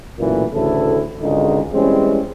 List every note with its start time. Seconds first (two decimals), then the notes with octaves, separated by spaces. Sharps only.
0.19 B1 F#2 A#2 E3 A3 A#3
0.53 D2 A2 C#3 E3 E4 A4
1.22 G#1 C#2 D3 D#3 G#3 D#4
1.74 E3 G3 G#3 C4 C#4